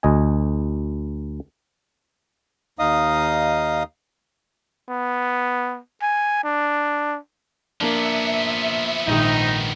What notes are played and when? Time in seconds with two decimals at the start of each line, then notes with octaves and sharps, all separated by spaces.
0.03 D2 D#5 G#5
2.79 D#2 D#4 D#5 F5 D#6
4.89 B3
6.02 G#5
6.44 D4
7.81 F3 A#3 B3 D4 E5
9.07 A#1 G#2 D#3 D#4